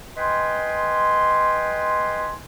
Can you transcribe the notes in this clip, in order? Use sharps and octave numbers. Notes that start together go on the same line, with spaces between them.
B4 D#5 G5 G#5 C6